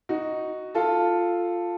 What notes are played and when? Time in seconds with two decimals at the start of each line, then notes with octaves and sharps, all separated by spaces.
0.09 D#4 F#4
0.75 F4 A4